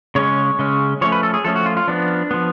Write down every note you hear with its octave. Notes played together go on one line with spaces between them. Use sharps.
C#3 G#3 C#4 C#5
C#3 G#3 C#4
F3 A3 C#4 C#5
B4
A4
G#4
F3 A3 C#4 A4
F#4
F4
F4
F3 B3 D4
F3 B3